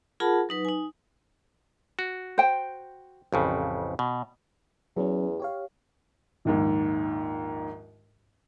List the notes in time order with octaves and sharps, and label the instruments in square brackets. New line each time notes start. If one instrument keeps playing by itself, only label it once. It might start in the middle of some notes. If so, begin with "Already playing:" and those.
[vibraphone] F4 G#4 A#4 F#5 A5 B5
F#3 D#4 B4
D#4 G#5
[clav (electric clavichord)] F#4
[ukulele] C5 G5
[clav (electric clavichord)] A1 F2 C#3
B2
[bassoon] E2 [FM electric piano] F#3 C#4
[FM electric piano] G4 C#5 F5
[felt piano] A#1 D#2 G#2